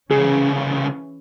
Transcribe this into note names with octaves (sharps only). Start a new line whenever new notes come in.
C2 C#3 E3 C#4 G#4